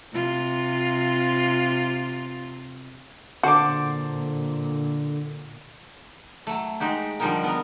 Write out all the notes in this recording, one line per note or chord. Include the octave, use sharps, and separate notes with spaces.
C3 F4
A#2 D3 F#4 C5 A5 D6
F#3 A3
G#3 D#4 F#4 G4
D3 F3 G3 D#4 A#4
B3 A#4